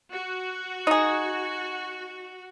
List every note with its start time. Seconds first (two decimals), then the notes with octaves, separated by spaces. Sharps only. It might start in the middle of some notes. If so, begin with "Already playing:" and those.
0.12 F#4
0.87 D#4 G#4